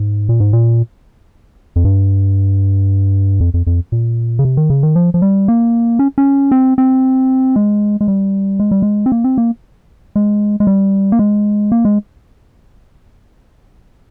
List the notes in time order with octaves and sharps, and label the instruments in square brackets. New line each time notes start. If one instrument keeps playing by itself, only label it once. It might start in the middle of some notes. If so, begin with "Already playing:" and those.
Already playing: [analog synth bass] G#2
A#2
G#2
A#2
F2
G2
F2
F2
F2
A#2
C#3
C3
D#3
C#3
D#3
F3
F3
G3
A#3
C#4
C#4
C4
C4
G#3
G#3
G3
G#3
G3
G#3
C4
A#3
C4
A#3
G#3
G#3
G3
A#3
G#3
A#3
G#3